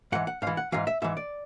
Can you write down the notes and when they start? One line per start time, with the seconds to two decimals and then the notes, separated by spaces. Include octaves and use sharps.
0.12 G#2 E3 F#5
0.27 F#5
0.42 G#2 E3 F5
0.57 F#5
0.72 G#2 E3 F5
0.87 E5
1.02 G#2 E3 E5
1.17 D5